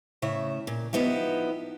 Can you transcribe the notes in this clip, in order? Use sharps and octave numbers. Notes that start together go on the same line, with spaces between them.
A2 C#3 E5
A#2
F3 B3 D#4 E4 G4